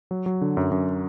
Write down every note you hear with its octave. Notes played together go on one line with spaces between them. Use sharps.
F#3
F#3
D3
F#2
F#2